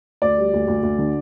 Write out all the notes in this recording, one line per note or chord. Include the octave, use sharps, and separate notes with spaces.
D2 D5
G3
D2
D2
D2
D3